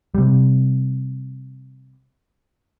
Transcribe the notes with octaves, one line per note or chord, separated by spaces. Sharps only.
C3 G3